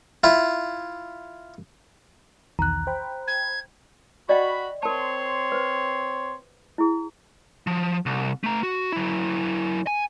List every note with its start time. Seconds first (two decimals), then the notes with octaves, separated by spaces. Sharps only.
0.24 E4 F4
2.59 B1 E2 D#3 A#5 F#6
2.87 C5 G5 B5
3.28 G#6
4.29 F#4 D5 D#5 G5 B5
4.83 C4 A#4 C#5 A5 C6
5.52 B4 C5
6.78 E4 G#4
7.67 F3
8.06 C2
8.44 A3 A#5
8.63 F#4
8.92 F#3 E4
9.87 G#5